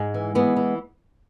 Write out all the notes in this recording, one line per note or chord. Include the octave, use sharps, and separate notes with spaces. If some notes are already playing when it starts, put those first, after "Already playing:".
Already playing: G#2 G#3
E3
E3 G#3 B3
E3